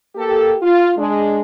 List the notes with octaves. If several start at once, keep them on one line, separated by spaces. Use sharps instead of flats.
A#3 G4 A4
F4
G#3 D4